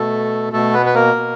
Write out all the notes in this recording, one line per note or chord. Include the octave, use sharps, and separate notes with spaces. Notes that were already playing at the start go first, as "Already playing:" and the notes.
Already playing: B2 A3 A4
B2 A3 A4
B3 B4
B4
A#3 A#4
B2